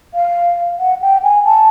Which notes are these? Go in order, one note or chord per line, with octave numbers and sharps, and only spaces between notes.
F5
F#5
G5
G#5
A5